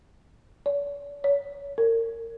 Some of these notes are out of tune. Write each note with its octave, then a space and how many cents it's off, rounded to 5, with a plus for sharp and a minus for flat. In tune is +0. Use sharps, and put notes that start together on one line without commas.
D5 -45
C#5 +25
A#4 -30